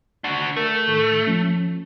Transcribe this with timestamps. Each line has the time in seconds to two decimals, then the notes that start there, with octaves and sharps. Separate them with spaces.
0.24 D4 F#4
0.56 A3 A#4
0.87 A2 D#3 A4
1.27 F3 C#4